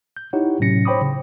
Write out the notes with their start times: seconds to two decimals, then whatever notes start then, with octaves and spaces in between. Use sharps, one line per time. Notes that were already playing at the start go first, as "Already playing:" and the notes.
0.17 G6
0.33 D#4 E4 G4 C#5 F#5
0.60 A2 C3 F#3 C#4 A#6 C#7
0.85 C5 C#5 G5 B5 D6 D#6
1.01 C#3